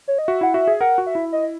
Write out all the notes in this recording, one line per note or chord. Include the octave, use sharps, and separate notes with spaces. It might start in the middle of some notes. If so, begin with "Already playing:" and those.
C#5
D#5
F#4 E5
E4 F#5
F#4 E5
G#4
A#4 F#5
F#4
E5
E4
D#5